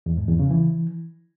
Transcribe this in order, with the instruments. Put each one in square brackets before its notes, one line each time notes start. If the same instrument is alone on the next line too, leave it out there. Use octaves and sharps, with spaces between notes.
[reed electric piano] E2
G#2
E2
C#3
E3